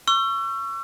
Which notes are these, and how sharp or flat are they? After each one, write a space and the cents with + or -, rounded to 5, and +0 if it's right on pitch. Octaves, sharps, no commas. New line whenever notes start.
C#6 +0 E6 +40